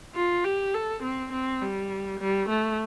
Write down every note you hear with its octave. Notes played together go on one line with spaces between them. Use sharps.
F4
G4
A4
C4
C4
G3
G3
A3